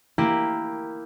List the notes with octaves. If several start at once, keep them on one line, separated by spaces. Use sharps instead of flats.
A#3 E4 G4